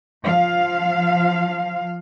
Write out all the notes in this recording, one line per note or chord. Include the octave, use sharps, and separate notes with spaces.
F3 F5